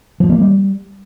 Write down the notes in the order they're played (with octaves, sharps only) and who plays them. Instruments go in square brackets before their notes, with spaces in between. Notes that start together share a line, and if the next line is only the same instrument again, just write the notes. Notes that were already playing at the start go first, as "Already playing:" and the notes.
[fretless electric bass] F3
A#3
G3